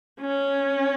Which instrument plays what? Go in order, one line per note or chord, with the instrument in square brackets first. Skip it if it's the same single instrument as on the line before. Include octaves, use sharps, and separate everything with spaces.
[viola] C#4